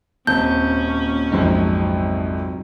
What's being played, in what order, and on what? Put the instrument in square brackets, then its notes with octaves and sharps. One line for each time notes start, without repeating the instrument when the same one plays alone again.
[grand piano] D#1 A5 [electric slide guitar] A#2 C4 [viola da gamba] C#4 [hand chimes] G6
[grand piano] A#1 F2 G#2 [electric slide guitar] C3 F#3 D#4